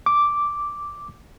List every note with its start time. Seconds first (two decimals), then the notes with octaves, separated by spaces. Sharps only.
0.06 D6